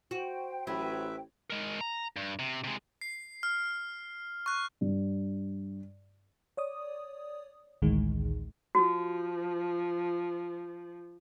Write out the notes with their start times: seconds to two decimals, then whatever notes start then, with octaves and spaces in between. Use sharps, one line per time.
0.11 F#4 C5 G5
0.67 A1 F#3 B4 E5
1.50 G#3 A#4
1.81 A#5
2.16 G2
2.39 C3
2.64 C3 G#3
3.01 C7
3.43 F6
4.46 C#6 F#6
4.81 G2
6.57 C#5 D5 D#6
7.82 A1 D2 A2 D#3 G#3
8.75 F3 F#4